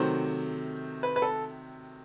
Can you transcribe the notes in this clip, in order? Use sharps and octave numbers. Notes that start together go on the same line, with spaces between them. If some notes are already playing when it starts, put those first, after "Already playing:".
Already playing: C3 D#3 F#3 A3 C5
B4
B4
A4